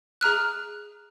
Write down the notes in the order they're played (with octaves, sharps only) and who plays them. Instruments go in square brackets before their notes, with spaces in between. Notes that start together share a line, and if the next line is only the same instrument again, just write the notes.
[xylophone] G#4 A#5 F6 F#6